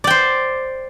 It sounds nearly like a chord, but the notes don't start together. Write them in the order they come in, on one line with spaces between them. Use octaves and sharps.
D5 G5 C5